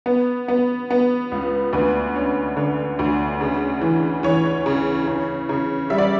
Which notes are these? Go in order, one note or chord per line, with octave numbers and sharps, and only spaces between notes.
B3
B3
B3
C#2
D2 B4
C#4
D3
D2
C#3
E3
E3 C#5
C#3
C#3
C#3
G3 E5
D5